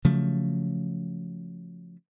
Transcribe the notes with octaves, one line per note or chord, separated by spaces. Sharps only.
C#3 F3 F#3 A3